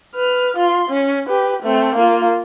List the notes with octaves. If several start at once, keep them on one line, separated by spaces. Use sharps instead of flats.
B4 F6
F4 C6
C#4
G4 B4
A3 C4
A#3 F4